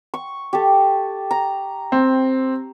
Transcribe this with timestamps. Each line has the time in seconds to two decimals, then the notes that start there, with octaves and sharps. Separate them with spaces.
0.14 C#6
0.53 G4 A4
1.31 A#5
1.92 C4